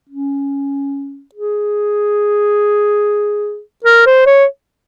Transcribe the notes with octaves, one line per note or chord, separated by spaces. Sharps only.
C#4
G#4
A#4
C5
C#5